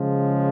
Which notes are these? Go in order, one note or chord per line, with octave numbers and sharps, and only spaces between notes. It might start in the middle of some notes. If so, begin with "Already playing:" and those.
Already playing: C#3 F3 G#3